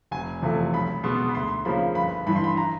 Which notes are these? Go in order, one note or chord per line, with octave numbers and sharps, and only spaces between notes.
F1 G#5
E2 C3 F3 A3
B1 B5
B2 G#3 B3 C6
B5
D2 C6
C#3 F3 A#3 B5
G1 B5
G2 E3 B5
C6
B5
A#5